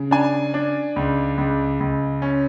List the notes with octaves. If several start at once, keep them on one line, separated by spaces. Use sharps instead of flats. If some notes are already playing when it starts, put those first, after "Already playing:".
Already playing: C#3
D4 G#5
D4
C#2
C#2
C#2
C#4